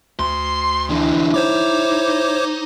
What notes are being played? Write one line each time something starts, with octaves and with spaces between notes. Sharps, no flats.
D2 C6
D3 E3 E4
D#4 C5 C#5 D6